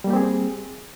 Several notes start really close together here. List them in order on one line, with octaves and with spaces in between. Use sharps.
G3 A#3 G4 C4 G#4